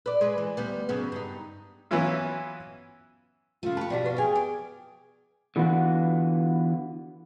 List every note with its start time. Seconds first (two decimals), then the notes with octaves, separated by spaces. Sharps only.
0.06 B4 D5
0.21 G#3 B4
0.38 E3
0.57 D2 G3 B3
0.89 F#2 C#3 B3
1.12 G2 D#4
1.91 E3 F#3 B3 C#4 E4 F4
3.63 C#3 A3 F4
3.77 G4 B4 A5 C#6
3.90 B2 F3 F#4 G4 D5 F5 F#5
4.04 F4 B4 F5 F#5 C#6
4.18 G#4 F5 G5 G#5 D6
4.35 D6
5.56 D3 E3 B3 F4 F#4